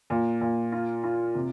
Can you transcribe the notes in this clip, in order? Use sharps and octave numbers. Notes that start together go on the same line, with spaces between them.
A#2
A#2
F4
F4
C3